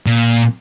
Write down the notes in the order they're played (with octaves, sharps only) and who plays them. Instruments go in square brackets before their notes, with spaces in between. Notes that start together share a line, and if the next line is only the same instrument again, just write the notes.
[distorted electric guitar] A#2